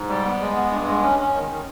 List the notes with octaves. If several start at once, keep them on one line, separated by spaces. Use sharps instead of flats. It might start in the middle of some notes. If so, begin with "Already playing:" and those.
Already playing: G#2
G3
B3
G#3
B3
G2
G#3
C#4
C#4
D#3
D#3